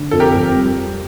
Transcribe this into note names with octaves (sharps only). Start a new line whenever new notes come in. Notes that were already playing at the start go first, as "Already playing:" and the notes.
Already playing: D3
F2 A4
G4 A#4
F2
G3